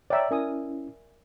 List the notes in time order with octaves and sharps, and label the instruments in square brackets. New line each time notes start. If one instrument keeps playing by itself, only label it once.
[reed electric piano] C#5 G5 A#5 [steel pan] D5 E5
[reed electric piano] C#4 E4 [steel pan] A#4 G#5 D#6